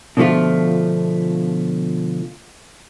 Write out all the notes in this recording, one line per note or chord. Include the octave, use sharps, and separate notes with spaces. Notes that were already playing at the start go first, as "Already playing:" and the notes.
B2 D3 F3 A3 F4